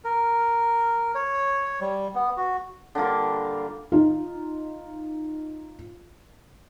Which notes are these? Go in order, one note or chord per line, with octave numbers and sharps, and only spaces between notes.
A#4
C#5
G3
B3
F#4
D3 G3 A#3 F4
D#4 F4